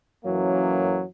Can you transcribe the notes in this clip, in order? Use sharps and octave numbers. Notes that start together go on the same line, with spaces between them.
F#2 E3 F#3 A#3 C#4